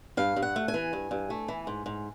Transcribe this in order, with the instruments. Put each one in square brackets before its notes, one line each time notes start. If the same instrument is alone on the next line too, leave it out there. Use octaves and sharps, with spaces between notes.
[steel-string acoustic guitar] G2 F5
G2
F#5
A3
G#5
E3
G2
G2
A3
E3
G#2
G#2